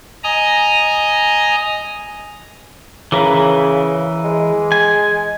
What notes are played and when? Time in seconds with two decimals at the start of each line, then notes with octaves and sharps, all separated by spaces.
0.24 D#5 G#5 A#5 D#6
3.12 C#3 E3 A#4 B4
4.24 G#3
4.72 G#5